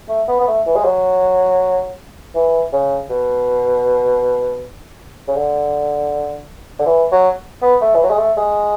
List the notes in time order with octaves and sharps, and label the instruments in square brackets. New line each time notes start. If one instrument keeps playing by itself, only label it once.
[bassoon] A3
B3
B3
A3
E3
G#3
F#3
E3
C#3
B2
C#3
D3
D3
E3
F#3
B3
A3
E3
F#3
G#3
A3
G#3